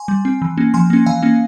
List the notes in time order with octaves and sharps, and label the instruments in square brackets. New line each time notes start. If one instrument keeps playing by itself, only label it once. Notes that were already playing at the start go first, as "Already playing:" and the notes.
Already playing: [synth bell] G#5 C6
G3
C4
E3
A#3 C#4
F3 G#5 C6
A#3 C#4
E3 F5 G#5
A#3 C#4